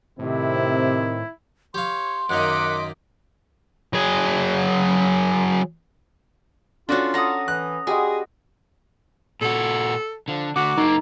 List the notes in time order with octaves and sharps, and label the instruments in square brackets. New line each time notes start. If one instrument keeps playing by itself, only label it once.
[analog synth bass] A2 [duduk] C3 [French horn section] D#3 C4 [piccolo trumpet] E4
[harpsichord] G4 F5 [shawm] C#5 [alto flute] C6
[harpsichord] F#2 D#3 A#3 [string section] D#5 D6 B6 [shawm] F#5
[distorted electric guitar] F#3 G#4
[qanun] C#4 A4 [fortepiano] D4 F#4 [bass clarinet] F4
[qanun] A4 F#5 [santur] A#5 D#6
[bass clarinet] E3 [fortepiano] F#6
[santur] G3 G#3 [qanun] F#4 [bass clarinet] G#4
[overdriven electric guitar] A#2 F#4 [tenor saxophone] A4
[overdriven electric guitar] D3 [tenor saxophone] F3
[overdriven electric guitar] D2 D3 [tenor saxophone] F#4 [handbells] D6
[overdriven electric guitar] F#2 A#3 [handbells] D#4